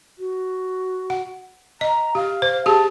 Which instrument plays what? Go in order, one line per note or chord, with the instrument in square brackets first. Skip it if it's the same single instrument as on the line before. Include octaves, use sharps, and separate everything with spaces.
[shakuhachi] F#4
[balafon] F#5
[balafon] D#5 [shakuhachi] A#5
[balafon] G4 [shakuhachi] F5
[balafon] C5
[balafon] G4 G#4 [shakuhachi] A5